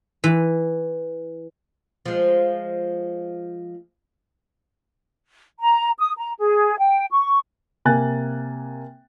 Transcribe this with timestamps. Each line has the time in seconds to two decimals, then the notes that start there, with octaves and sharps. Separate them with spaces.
0.24 E3
2.06 F3 G#3
5.59 A#5
5.98 D#6
6.17 A#5
6.38 G#4
6.78 G5
7.11 C#6
7.85 C3 A#3 G#5 F#6 A6